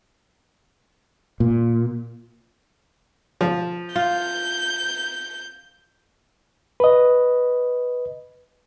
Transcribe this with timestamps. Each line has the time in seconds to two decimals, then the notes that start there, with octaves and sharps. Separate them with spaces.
1.40 A#2
3.41 F3
3.96 F4 G6
6.80 B4 D#5